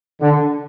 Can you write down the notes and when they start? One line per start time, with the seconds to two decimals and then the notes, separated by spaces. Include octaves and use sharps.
0.21 D3